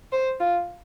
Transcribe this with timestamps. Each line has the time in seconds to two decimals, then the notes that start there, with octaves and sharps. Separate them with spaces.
0.12 C5
0.40 F4